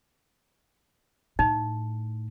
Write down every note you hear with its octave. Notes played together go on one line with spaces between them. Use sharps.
A2 D#4